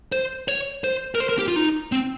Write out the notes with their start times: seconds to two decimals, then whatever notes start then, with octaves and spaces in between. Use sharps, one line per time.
0.12 C5
0.48 C#5
0.84 C5
1.15 A#4
1.20 C5
1.29 A#4
1.39 G4
1.48 F4
1.56 D#4
1.92 C4